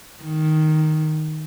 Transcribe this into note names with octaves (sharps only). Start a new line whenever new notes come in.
D#3